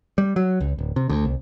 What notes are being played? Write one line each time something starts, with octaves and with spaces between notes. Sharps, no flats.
G3
F#3
C#2
D1
C3
D2
C2